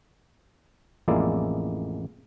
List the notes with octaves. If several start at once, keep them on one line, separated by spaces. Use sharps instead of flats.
A1 F2 G#3 A#3 E4 D5